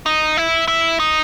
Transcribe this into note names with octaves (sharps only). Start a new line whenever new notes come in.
D#4
E4
E4
D#4